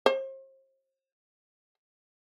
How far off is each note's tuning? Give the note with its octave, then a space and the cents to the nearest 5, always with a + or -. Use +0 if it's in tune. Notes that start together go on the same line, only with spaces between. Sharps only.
C5 +40